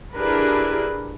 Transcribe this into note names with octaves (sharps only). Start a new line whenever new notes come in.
D4 E4 G4 G#4 A#4 B4